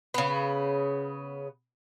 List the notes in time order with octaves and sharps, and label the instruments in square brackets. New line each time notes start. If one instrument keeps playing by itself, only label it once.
[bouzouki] C#3 B3